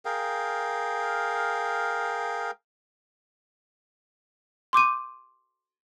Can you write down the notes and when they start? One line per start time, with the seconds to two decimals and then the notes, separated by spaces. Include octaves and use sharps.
0.05 G#4 A#4 F5 G5
4.73 C6 D6 G6 D#7